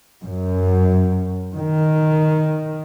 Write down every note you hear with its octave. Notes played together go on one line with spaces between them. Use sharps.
F#2
D#3